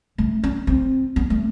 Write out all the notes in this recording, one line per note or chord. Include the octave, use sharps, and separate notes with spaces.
A3
C#4
C4
B3
A3